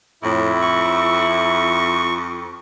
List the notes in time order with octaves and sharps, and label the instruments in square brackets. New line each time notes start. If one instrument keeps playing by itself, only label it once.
[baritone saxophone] F2 [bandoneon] A2 [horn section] E4
[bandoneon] C#6